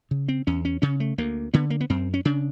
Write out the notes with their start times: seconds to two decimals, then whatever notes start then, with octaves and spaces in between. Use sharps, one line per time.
0.11 C#3
0.28 C4
0.47 E2 C#4
0.65 C#4
0.82 C#3 C#4
1.00 A3
1.18 D2 A#3
1.54 D3 B3
1.70 A#3
1.81 B3
1.90 F#2 C4
2.14 C#4
2.25 C#3 D4